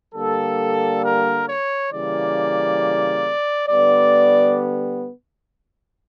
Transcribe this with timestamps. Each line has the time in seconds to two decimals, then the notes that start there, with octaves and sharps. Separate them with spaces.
0.14 D3 G3 A#3 A4
1.02 A#4
1.47 C#5
1.91 C#3 E3 G3 A#3 D5
3.68 D3 G3 B3 D5